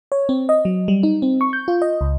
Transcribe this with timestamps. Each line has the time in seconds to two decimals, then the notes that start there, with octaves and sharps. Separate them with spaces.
0.12 C#5
0.29 C4
0.49 D#5
0.65 F#3
0.88 G3
1.03 D#4
1.22 C4
1.41 C#6
1.53 G6
1.68 F4
1.82 D#5
2.01 C#2